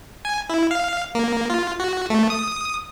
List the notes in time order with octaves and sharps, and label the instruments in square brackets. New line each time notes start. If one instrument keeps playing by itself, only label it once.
[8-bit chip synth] G#5
E4
F5
A#3
F4
F#4
A3
D#6